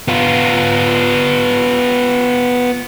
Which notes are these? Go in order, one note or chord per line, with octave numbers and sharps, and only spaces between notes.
B3 F4